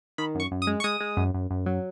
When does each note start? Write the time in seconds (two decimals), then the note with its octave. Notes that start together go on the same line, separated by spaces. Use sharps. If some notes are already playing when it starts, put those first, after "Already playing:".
0.18 D#3 B5
0.35 F#2 C#6
0.51 F#2
0.62 D#6
0.67 G#3
0.80 C#6
0.84 G#3 D#6
1.00 G#3
1.17 F#2
1.34 F#2
1.51 F#2
1.66 F#3